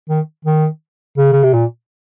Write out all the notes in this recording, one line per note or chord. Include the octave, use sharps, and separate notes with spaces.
D#3
D#3
C#3
C#3
C3
A#2